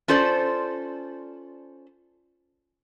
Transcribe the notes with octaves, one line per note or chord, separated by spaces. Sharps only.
C#4 F4 A4 C5 D5